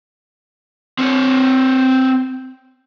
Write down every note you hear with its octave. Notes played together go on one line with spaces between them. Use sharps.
C4 C#5